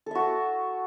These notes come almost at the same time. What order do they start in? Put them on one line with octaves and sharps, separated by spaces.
A4 E5 F#4 A5